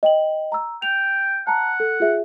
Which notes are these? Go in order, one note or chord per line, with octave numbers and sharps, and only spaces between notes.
D#5 G5 F#7
A#5 E6
G5 F7
F#5 A5 A#5
A4
F4 G#4 E5